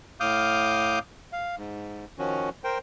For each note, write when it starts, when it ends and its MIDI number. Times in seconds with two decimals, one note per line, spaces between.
0.20 0.99 45
0.20 0.99 77
0.20 0.99 86
0.20 0.99 87
0.20 0.99 89
0.20 0.99 91
1.33 1.56 77
1.58 2.05 44
2.19 2.49 51
2.19 2.49 53
2.19 2.49 61
2.19 2.49 66
2.64 2.78 70
2.64 2.78 72
2.64 2.78 79